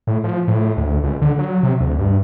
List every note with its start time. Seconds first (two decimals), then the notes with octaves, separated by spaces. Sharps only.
0.07 A2
0.24 F3
0.48 A2
0.77 D2
1.03 C#2
1.22 D3
1.39 F#3
1.63 C3
1.80 D2
1.99 G2